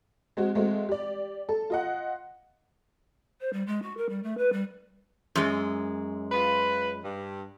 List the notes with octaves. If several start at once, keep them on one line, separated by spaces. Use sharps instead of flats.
G#3 C4 F#4
G#3 A3 C4 F#4
G4 D5
A4
F4 D#5 F#5
C5
G3
G#3
F#4
A#4
G3
A3
B4
G3
F#2 G#3
F4 B4
G2